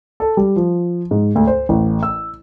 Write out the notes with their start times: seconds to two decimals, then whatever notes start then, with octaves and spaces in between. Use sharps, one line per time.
0.20 A4
0.37 G3
0.56 F3
1.11 G#2
1.35 D2
1.47 C5
1.69 A1
2.03 E6